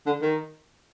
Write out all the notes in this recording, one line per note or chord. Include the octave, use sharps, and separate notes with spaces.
D3
D#3